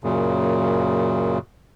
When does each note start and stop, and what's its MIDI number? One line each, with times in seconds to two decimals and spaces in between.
0.04 1.38 42
0.04 1.38 46
0.04 1.38 49